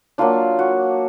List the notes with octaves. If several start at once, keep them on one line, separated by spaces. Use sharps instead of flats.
F#3 A#3 D4 F4
F#4